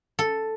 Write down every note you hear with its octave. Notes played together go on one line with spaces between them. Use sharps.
A4